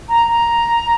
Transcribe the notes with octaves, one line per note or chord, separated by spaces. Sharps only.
A#5
A#5